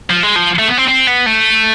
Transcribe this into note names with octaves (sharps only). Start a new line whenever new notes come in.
F3
G#3
F3
A3
B3
C4
C4
B3
A3